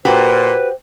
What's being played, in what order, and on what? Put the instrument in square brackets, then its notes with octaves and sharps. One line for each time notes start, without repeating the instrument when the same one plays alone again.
[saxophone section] A#2 [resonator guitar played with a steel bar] F#4 G4 [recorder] B4 [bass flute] C5